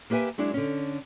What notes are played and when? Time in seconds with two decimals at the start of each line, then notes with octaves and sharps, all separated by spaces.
0.10 A#3 G4 B4 E5 G#5
0.38 F#3 G#3 D4 E4
0.54 D3 C#4